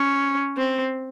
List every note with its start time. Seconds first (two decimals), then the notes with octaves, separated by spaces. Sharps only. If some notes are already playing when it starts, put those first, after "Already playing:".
Already playing: C#4
0.58 C4